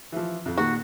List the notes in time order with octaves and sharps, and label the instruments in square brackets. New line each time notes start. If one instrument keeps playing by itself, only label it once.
[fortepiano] E3 F3
F2
[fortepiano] A#2 D#3 [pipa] F#4